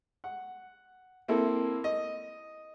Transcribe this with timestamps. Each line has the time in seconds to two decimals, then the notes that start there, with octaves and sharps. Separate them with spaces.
0.24 F#5
1.28 A#3 C4 E4 A4
1.84 D#5